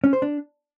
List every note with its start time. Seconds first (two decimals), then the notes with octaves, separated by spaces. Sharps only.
0.04 C#4
0.13 C5
0.22 D4